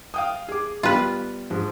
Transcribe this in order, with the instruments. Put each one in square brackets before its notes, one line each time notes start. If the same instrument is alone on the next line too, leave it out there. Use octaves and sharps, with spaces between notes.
[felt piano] F5 G5 D#6
G#4 D6
[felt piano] G3 B3 [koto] F4 B4
[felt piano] G#2 F3